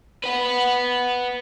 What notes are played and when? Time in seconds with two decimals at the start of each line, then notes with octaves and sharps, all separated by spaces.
0.24 B4 F#5